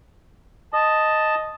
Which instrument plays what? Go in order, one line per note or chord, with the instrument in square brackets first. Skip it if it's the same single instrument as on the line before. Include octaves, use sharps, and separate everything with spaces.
[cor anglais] D#5 [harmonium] A5